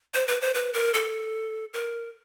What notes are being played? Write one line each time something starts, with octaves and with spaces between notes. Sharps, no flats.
C5
B4
C5
B4
A#4
A4
A#4